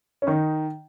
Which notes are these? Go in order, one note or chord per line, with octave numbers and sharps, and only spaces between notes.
C#4
D#3 D#4